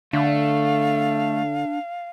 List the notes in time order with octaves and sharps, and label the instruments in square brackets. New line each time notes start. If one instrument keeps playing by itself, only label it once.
[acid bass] D3 [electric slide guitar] A3 [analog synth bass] D4 [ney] F5